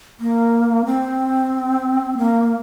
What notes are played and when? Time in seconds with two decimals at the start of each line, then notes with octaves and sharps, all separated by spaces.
0.20 A#3
0.86 C4
2.18 A#3